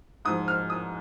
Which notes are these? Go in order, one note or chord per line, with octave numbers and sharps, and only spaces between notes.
G#2 F3 D#6
F6
D#6